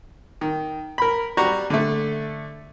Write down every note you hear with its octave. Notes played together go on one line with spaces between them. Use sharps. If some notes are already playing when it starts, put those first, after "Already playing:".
D#3
A#4 B5
G3 F#4 A#5 C#6
D3 A3